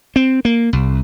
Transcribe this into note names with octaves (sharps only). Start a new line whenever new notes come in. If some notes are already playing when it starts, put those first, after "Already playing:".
C4
A#3
C2